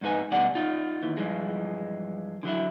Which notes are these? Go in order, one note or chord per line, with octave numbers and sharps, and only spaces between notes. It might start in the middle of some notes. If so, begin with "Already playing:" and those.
F2 G#2 D#4 B4 G#5
D2 B2 G3 D5 F#5
D#4 F4
D#2 E3
G2 E3 F3 G#3
D3 F#3 E4